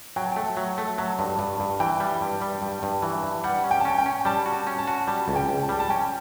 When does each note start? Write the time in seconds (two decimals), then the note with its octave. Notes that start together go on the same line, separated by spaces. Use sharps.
0.16 F#3 G5
0.24 A5
0.32 A3 G5
0.57 F#3
0.78 A3
0.98 F#3 A5
1.19 G2
1.39 G2
1.60 G2
1.80 E3 G5
2.00 G3
2.21 G2
2.42 G3
2.62 G2
2.83 G2
3.02 E3
3.23 G2
3.44 G3 F#5
3.64 C#4
3.71 G5
3.80 A5
3.85 C#4 G5
3.98 G5
4.06 C#4
4.25 G3 A5
4.46 F#4
4.52 A5
4.67 C#4
4.78 A5
4.87 F#4
5.07 G3 A5
5.28 C#2
5.36 G5
5.49 C#2
5.63 A5
5.69 G3
5.79 A5
5.90 C#4 G5